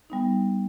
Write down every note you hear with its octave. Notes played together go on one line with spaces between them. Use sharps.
G3 B3 D#4